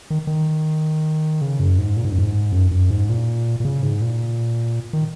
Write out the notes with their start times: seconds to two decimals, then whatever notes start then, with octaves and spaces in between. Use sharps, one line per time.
0.10 D#3
0.27 D#3
1.41 C#3
1.60 F#2
1.78 G#2
1.97 A#2
2.05 G#2
2.11 F#2
2.18 G#2
2.52 F#2
2.71 F#2
2.90 G#2
3.09 A#2
3.60 A#2
3.65 C#3
3.83 G#2
4.02 A#2
4.93 D#3